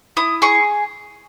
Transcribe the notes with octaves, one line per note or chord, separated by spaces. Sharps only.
E4 D#6
G#4 C#6